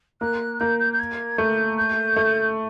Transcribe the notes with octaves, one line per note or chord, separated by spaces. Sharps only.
A#3 F#6
A#3 G6
G6
G6
G#6
A3 G6
G6
A3